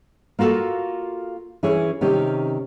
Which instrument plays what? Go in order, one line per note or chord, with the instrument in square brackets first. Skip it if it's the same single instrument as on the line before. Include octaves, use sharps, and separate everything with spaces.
[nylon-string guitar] A#3 F4 F#4 A4
E3 C#4 E4 G#4 C#5
C3 D#3 C#4 G4